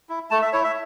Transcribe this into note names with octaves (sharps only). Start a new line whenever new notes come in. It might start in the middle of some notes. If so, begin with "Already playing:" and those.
E4
A3 A5
E5
E4 C#5
E5